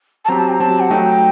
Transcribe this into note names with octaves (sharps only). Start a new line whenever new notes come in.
A5
F#3 C4 G4 A#5
A5
G5
A#5
F#3 C4 G4 A5
F#5
F#3 A3 D#4 G5